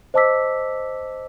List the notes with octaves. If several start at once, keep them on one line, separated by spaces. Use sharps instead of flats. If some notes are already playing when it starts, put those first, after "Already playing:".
C5 D#5 A5 D6 E6 B6